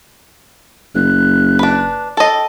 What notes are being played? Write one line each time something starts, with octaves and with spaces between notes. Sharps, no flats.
F#1 F#6
D4 B4
A4 D#5 G5